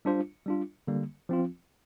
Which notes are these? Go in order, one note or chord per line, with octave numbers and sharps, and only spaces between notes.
G3 D4 F4 C5
G3 D4 F4
D3 G3 A#3
F3 C4 F4